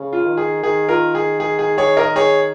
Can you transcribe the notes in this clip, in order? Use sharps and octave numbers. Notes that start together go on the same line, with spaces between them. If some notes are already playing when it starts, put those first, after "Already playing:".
Already playing: C#3
F4
D#3
G#4
D#3 G#4
F4 A#4
G#4
G#4
G#4
G#4 C#5
A#4 D#5
G#4 C#5